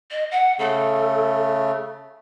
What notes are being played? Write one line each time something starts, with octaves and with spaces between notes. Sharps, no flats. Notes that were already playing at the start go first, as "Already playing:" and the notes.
D#5
F#5
C#3 A3 A4